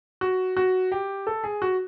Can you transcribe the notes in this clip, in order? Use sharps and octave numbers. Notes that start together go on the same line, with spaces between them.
F#4
F#4
G4
A4
G#4
F#4